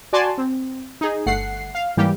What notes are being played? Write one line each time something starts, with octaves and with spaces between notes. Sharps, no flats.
F#4 D5 G#5 A5 C6
C4
D#4 G#4
G1 A3 F#5 C7
F5
G#2 E3 G3 A#3 G4